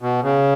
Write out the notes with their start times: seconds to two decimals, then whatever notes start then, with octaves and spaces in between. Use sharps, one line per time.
0.02 B2
0.22 C#3